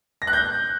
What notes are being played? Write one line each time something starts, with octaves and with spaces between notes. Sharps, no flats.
A#6
F#6
G6